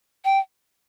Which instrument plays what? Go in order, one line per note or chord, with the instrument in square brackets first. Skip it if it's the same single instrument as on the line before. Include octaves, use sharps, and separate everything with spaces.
[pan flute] G5